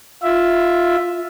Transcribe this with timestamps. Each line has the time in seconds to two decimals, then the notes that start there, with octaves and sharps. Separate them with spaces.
0.23 F4 E5